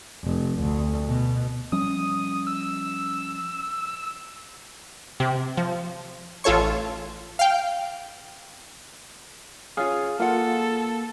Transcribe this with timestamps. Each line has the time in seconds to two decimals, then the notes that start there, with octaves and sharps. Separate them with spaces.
0.24 F1
0.59 D2
1.07 B2
1.72 F3 G3 C#4 D#6
2.47 E6
5.20 C3
5.57 F3
6.44 A1 F4 A4 C#5 C#6
7.39 F5 G5
9.77 C#4 F4 G#4 F5
10.20 A#3 F4 A4 F#5